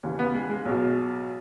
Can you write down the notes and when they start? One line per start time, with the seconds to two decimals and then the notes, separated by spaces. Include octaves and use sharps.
0.03 D#2 C#3 E3
0.19 B3
0.34 G#3
0.50 G#3
0.65 B1 B2